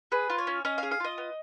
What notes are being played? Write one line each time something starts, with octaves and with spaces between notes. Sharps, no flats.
G#4 B4
F4
C#5
C#4
C#4 D#5
F5
G#4
F5
F4 D#5
B3